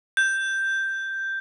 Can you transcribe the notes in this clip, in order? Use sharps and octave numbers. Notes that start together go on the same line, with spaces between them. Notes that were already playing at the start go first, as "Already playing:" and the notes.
G6